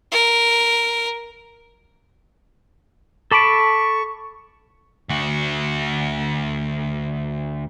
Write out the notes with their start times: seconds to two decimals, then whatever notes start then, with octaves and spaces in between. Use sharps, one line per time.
0.12 A#4
3.31 A4 A5 B5 C#6 D6 B6 D7
5.09 D2 F#4